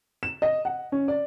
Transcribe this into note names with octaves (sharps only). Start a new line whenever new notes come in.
E7
D#5
F#5
C#4
D5